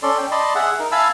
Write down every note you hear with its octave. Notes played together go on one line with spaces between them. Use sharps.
C#4 A4 D5 C6
G5
D5 D#5 A5 B5 C6
G#4 E5 F#5
D#4 A#4
E5 F5 G#5 A5 B5 E6